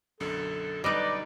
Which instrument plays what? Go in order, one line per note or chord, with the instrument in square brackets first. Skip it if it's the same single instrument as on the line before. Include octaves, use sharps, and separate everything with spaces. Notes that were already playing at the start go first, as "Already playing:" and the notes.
[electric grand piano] B1 F#2 D3 [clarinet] A4
[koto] G3 D#4 [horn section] B4 D5 [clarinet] D#5